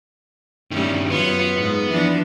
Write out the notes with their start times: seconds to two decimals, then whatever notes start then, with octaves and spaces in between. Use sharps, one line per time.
0.71 G2 D#3 G3 A3 C#4
1.10 F#2 B3 F4 C#5
1.57 G#2
1.91 E3 F3 D4